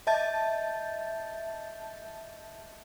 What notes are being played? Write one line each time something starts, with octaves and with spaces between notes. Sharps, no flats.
D#5 E5 A5 G6 A6